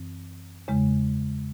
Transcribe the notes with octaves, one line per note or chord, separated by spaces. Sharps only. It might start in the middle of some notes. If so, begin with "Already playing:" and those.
Already playing: F#2 E3 C4
E2 C#3 G#3